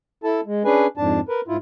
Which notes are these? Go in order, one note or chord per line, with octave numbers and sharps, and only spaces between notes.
E4 A4 A5
G#3
C#4 D4 G#4 B4 G#5
F2 G#2 D4 A5
A#4 B4
G#2 E4 F4